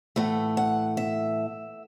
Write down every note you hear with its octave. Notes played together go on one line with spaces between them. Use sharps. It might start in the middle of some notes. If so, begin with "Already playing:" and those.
A2 E3 A3 F#5
F#5
E5